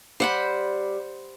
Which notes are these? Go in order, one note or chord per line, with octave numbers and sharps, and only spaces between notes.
G3 C5 F#5 B5